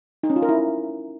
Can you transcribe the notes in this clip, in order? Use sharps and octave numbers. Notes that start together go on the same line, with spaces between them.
D#4
C#4
F4
A#4
E4